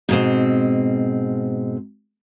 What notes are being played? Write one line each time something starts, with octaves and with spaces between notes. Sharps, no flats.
G#2 B2 C4